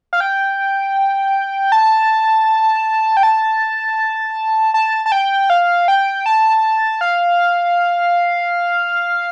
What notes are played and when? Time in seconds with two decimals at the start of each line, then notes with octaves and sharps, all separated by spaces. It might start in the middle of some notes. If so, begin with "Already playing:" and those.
0.13 F5
0.20 G5
1.72 A5
3.17 G5
3.23 A5
4.74 A5
5.06 A5
5.12 G5
5.50 F5
5.88 G5
6.26 A5
7.01 F5